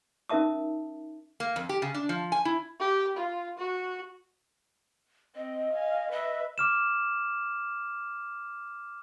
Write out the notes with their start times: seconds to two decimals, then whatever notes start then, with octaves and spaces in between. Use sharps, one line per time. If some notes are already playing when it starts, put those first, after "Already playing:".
0.29 C#4 D#4 A#4 E5 A5 D#6
1.40 A#3
1.56 F2
1.69 G4
1.82 C#3
1.94 D4
2.09 F3
2.32 G#5
2.45 E4
2.80 G4
3.16 F4
3.57 F#4
5.36 C4 D#5
5.73 F5 G#5
6.11 B4 D#5 E5
6.58 D6 F6 E7